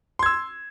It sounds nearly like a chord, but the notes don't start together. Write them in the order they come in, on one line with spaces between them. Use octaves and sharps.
C6 G#6 E6